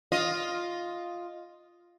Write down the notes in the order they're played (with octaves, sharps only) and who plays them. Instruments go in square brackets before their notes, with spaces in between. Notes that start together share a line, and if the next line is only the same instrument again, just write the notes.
[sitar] F4 D#5